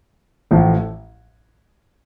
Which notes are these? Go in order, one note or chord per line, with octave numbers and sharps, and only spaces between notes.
A1 A2 F3 A3